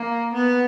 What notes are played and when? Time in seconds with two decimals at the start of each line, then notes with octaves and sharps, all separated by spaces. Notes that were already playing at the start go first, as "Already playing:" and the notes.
Already playing: A#3
0.33 B3